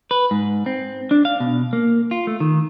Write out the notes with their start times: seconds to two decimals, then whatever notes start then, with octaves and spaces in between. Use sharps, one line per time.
0.11 B4
0.31 G#2
0.66 C4
1.11 D4
1.25 F5
1.40 B2
1.73 A#3
2.11 F4
2.27 A3
2.40 D#3